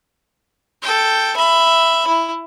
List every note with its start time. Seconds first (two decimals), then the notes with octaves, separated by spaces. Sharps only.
0.83 A4 G5
1.36 E5 B5
2.07 E4